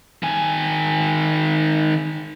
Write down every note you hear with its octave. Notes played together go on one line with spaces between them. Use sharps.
D#3 G#5